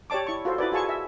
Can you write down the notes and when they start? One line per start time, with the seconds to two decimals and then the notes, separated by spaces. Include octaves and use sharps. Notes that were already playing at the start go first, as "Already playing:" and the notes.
0.10 G4 C#5 D5 A5 D6
0.27 E4 C#6
0.45 F4 F#4 A4 C5
0.58 E4 F#4 B4 D5
0.72 F4 F#4 G#4 G#5 A5 C#6
0.89 E5